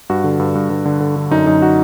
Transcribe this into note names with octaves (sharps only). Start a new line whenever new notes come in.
G2 F#4
D3
G2
G2
G2
D3
D3
D3
F#2 D#4
F#2 D#4
F#4